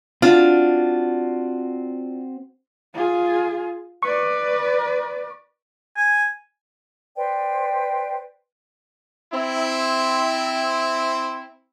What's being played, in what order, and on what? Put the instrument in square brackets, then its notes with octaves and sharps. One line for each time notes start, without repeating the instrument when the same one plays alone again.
[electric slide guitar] C4 F#4 [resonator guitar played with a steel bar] D4 F4
[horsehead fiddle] F4 G#4
[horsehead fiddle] B4 D5 [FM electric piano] C#6
[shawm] G#5
[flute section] B4 C5 D5 G5
[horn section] C4 E4